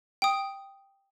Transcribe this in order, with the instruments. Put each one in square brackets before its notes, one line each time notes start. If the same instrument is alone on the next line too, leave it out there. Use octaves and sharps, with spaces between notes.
[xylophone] G5 D#6